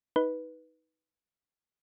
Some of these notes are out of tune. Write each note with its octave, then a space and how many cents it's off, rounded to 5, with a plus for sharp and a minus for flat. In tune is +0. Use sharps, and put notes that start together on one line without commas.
D#4 +20 B4 -5